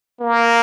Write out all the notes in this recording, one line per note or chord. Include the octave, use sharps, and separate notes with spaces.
A#3